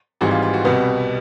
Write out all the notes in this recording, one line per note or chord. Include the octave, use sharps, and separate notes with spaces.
G#1 G#2 E3 G3 F#4
F4
F4
F#4
C2 B2 G3 B3